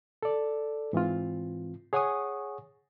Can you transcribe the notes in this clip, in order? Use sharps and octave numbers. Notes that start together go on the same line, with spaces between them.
A4 D5
G#2 E3 C4 F4
G#4 C#5 F#5 G#5 C#6 D#6